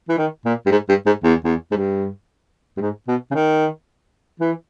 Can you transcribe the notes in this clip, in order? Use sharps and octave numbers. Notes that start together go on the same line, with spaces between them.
E3
D#3
A#2
G2
G#2
G2
G#2
E2
E2
G#2
G2
G2
G#2
B2
C#3
D#3
E3